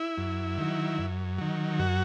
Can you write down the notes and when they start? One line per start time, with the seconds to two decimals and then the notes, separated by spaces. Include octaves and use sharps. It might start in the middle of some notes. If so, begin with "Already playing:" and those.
Already playing: E4
0.18 F#2
0.58 D#3 F#3
0.99 F#2
1.38 D#3 F#3
1.79 F#2 F#4